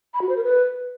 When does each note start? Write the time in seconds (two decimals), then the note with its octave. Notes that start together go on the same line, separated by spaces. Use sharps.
0.14 B5
0.22 F#4
0.29 C5
0.37 A#4
0.44 B4